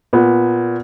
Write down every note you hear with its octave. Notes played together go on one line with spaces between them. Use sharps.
A#2 B3